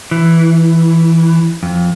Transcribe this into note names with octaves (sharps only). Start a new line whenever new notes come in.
E3
F2